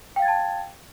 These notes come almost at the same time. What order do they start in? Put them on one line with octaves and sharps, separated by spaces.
G5 F5 A6 G#6 A5